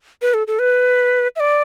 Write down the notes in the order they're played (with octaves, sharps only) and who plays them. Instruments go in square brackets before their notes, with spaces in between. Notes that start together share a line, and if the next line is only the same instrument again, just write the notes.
[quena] B4
A4
A4
B4
E5
D5